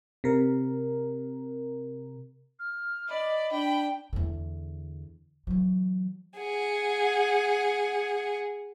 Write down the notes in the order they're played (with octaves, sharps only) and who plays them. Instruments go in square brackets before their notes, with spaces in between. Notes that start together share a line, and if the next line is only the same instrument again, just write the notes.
[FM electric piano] C3 A#4
[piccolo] F6
[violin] D5 [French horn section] D#5 [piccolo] B5
[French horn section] D4 [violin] G5
[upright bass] E2 D3
E3 F#3
[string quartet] G#4 F#5